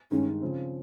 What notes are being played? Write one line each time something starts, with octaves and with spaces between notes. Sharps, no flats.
G2 D#3 G#3 C#4 D#4
C#3 F3 C4